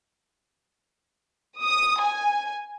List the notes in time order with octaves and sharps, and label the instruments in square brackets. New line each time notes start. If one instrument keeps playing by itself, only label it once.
[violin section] D#6
G#5